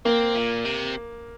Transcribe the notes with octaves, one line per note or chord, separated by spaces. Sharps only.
A#3 C4
A#2
C3